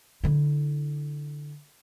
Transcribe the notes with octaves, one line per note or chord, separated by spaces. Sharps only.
D3 E4